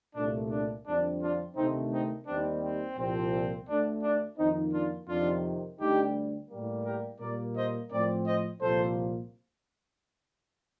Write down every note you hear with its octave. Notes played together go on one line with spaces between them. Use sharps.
C2 A#2 A3 D4
D4
F2 D3 G3 C4 D4
D4 F4
D2 C3 D#3 A3 C4 D#4
C4 D#4
D#2 D#3 G3 C4 D4
C4
C2 A#2 F3 C4
D2 D3 A3 D4
D4
F2 D#3 A#3 C4 D#4
D4 F4
F2 C3 D#3 D4 F4
D2 D3 G3 D#4 G4
A2 G3 A#3
G4 A#4
A#2 G3 A#3 A#4 D5
C5 D#5
A2 F3 C4 A#4 D5
C5 D#5
C2 A#2 F3 A#3 A4 C5